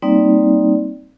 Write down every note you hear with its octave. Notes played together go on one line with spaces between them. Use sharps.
G3 A#3 C4 D#4 D5